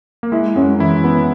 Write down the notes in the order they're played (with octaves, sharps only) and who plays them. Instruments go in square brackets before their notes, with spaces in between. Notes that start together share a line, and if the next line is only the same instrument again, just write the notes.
[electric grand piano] A#3
[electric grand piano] G#3 [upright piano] E4
[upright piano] F#2 [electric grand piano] G#3
[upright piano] E3 [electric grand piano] E4
[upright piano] B3